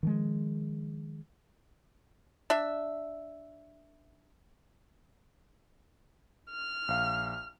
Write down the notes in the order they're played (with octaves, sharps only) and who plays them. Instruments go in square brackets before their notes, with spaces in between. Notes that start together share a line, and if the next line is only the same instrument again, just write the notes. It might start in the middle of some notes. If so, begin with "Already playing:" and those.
[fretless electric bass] D#3 F3 G#3
[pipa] D4 E5
[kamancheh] F6
[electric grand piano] A#1 F5